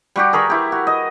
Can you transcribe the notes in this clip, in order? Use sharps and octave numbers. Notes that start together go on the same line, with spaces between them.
G3 F#4 G4
G#4 A#4 B5 C#6
E4 G4
F#4
D#5